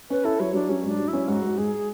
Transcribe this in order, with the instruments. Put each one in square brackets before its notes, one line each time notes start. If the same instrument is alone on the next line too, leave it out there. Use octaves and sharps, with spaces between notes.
[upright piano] C#4 [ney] B4
[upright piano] E4 [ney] A4
[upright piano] F#3 [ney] C#5
[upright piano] F#3 [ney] D4
[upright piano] F#3 [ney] C#4
[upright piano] G#2
[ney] D4
[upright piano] F#3
[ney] E4
[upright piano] C#4
[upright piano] G#2 [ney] F#4
[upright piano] G#2
[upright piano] G#2 [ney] G#4